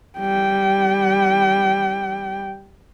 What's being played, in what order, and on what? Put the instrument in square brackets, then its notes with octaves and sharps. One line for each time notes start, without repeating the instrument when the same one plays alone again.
[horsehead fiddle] G3 G5